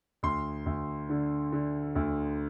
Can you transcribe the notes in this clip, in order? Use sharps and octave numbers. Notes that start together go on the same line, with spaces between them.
D2 C6
D2
D3
D3
D2